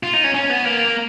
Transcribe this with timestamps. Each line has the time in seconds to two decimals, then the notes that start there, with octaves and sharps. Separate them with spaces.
0.03 F4
0.13 D#4
0.24 C#4
0.34 C#4
0.50 B3
0.65 A#3